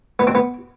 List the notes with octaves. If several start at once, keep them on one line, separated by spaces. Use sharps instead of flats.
B3
C4
B3